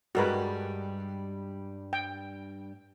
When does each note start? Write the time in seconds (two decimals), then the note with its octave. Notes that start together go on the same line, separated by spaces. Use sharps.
0.15 G2 G3 G#3 F#4 A#4 B4
1.93 G5